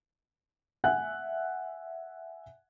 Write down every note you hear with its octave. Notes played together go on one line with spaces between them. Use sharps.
E5 F#5 G#5 F#6